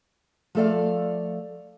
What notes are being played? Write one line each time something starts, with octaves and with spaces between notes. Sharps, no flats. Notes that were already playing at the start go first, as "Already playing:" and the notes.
F3 A3 A4 D5 F5